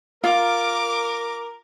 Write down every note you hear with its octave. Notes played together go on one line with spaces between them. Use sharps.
F4 A#4 D6